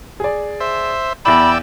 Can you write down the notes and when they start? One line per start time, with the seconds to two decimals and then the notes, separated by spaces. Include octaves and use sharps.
0.20 G#4 D5
0.60 C5 E5
1.25 E2 E4 D5 G5 B5 E6 F#7